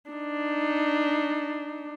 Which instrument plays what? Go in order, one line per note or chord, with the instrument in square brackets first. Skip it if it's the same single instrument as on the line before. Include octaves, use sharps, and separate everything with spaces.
[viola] D4 D#4